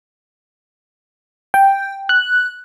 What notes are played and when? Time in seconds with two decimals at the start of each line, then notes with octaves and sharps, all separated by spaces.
1.54 G5
2.09 F#6